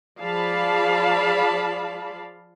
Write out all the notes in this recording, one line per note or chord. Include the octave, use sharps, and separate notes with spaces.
F3 G#4 D5 F5 A5 B5